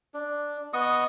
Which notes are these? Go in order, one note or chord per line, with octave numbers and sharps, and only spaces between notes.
D4
B3 D#5 C#6 D#6